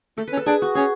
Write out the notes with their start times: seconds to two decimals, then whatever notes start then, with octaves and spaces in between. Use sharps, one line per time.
0.17 A3 A4
0.27 C#4 B4
0.37 A4
0.46 D4 G#4
0.62 F#4
0.75 C#4 G#4